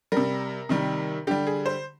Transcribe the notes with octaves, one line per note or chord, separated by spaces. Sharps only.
C3 G3 A#4
C3 D#3 G3
D3 G3 G4
G#4
C5